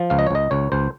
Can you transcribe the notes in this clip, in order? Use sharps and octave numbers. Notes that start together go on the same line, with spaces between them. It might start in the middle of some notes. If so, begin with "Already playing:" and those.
Already playing: F3
C#2 F5
D#5
C#5
C#2 D#5
C#2 C#5
C#2 C5